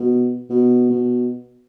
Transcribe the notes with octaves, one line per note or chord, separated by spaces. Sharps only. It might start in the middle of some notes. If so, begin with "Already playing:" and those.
Already playing: B2
B2
B2